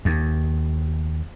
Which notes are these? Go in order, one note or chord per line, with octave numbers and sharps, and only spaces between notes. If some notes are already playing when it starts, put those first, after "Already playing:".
D#2